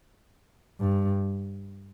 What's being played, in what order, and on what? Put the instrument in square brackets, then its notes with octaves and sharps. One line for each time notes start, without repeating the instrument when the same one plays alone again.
[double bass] G2